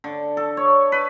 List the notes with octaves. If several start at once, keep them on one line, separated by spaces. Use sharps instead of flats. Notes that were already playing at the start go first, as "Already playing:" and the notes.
D3
A4
C#5
B4